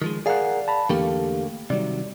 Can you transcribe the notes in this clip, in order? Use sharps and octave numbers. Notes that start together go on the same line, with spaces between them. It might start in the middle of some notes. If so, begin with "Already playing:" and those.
D#3 F3 G#3
G#4 A#4 D5 F5 F#5
A5 B5
E2 D3 A3 A#3 G4 F5
C3 D#3 F#3 G3 D5